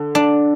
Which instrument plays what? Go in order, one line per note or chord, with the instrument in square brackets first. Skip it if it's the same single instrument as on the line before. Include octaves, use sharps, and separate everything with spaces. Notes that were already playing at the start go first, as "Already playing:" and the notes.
Already playing: [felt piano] D3
[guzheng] D4